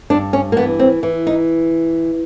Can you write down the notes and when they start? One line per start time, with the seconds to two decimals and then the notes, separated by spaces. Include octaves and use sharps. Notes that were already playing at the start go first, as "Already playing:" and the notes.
0.10 G2 D4
0.33 C#4
0.52 A#3
0.57 E3 B3
0.79 C4
1.03 E3
1.27 D#4